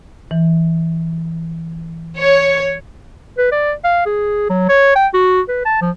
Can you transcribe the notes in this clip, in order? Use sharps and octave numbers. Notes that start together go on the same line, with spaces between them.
E3
C#5
B4
D5
F5
G#4
F#3
C#5
G5
F#4
B4
A5
F3